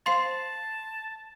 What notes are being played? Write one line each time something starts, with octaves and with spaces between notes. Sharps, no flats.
C5 F5 A5 C6 C7